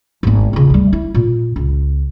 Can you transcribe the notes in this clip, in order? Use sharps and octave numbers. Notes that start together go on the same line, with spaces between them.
G#1 B3
D#1 C#3
D2 G3
E4
A#2
C#2